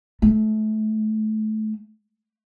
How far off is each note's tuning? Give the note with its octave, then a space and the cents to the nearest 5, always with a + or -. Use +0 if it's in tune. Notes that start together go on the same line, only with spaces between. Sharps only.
A3 -25